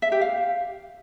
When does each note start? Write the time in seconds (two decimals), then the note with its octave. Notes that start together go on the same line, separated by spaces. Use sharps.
0.02 E5
0.12 G4
0.21 F5